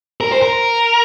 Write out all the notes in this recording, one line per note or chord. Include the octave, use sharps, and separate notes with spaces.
A#4
C5
A#4